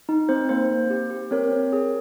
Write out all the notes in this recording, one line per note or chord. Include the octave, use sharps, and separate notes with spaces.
D#4
C4 C5
A#3 C5
A#3
G4
G4
C4 A#4 C#5
C4
G#4